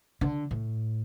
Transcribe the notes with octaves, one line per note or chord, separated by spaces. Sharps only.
D3
A2